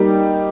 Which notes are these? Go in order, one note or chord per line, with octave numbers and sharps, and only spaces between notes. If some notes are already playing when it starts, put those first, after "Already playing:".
Already playing: G3 A#3 D#4 G4